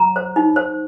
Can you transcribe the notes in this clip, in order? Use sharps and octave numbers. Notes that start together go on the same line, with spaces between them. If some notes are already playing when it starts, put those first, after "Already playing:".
Already playing: F#3 A#5
C5
D#4
C5